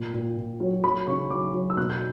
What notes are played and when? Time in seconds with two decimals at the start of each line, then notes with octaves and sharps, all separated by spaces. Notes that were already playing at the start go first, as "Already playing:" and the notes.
Already playing: A#2 G5
0.14 A#2
0.37 A#2
0.60 F#3
0.83 F#3 B5
1.07 C#3 C#6
1.30 F#3 D6
1.54 F#3
1.70 E6
1.77 B2 F#6
1.90 G6